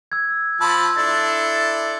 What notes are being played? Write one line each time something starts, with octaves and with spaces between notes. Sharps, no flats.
E6 G#6
F3 A5 B5 C6 E6
D4 E4 A4 A6